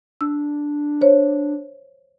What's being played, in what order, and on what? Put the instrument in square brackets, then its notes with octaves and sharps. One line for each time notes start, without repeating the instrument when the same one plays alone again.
[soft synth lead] D4 [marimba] E6
[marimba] C5 C#5